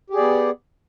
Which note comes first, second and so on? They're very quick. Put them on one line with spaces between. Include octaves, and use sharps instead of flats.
G4 G#4 D5 B3